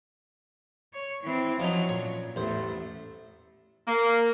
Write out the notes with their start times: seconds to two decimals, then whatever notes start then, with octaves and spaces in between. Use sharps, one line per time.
0.93 C#5
1.23 E3 C4
1.59 F3 F#3 C#4 D#4
1.89 A#2 C#5
2.36 A1 E2 A3 C5
3.87 A#3